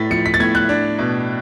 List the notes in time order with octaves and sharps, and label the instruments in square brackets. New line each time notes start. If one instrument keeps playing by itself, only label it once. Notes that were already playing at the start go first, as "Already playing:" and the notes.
Already playing: [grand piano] A2 A6 B6
F3 C#7
B6
A6
A2 G#6
F#6
D4
B2